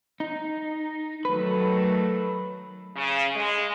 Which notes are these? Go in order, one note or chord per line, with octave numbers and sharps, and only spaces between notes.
D#4
D#3 F#3 A3 B4
C#3
G#3